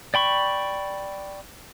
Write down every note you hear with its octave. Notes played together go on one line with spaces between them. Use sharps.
D5 G5 B5 C#6